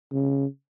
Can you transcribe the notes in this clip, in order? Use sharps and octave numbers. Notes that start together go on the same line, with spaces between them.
C#3